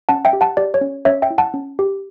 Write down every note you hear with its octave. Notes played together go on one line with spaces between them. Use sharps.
C#4 F#5 A5
E5 G5
G4
F#5 A5
G4 D5
C#5
C#4
C#4 C#5 E5
E5 G5
E4
F#5 A5
C#4
G4